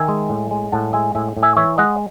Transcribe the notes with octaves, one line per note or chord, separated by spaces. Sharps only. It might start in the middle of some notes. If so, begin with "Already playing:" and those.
Already playing: D#3 E5 G#5
G#3
A2
G#3
A2 F#5 A5
G#3 E5 G#5
A2 E5 G#5
A2
E5 G#5
E3 C#5 E5
G#3 D#5 F#5